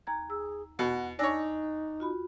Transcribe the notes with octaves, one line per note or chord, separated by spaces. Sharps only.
D#2 A#5 G#6
G#4 E6
E2 B2 F#5
D4 D#4 C#5 G#5 E6 A#6
F4 F#4 B5